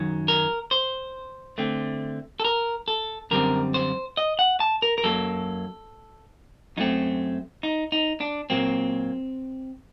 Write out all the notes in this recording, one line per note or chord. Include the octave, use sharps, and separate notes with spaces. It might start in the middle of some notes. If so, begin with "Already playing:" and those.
Already playing: F#2 D#3 F#3
A#4
C5
D3 A3 C4
A4
A#4
A4
F#2 D3 G3 C4 A#4
C5
D#5
F#5
A5
A#4
A#4
F#2 F#3 A#3 A4
F#2 F#3 A3 C4 D#4
D#4
D#4
D4
A#2 F#3 A#3 C4